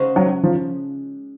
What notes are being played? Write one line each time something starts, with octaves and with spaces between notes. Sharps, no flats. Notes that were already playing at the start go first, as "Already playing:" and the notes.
Already playing: C#3 G#3 D#4 F#4 C5
F#3
F3